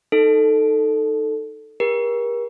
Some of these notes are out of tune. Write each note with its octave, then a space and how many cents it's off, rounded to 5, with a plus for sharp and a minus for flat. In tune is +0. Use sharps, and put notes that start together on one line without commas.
D#4 +0 A4 +5
G4 +40 A#4 +35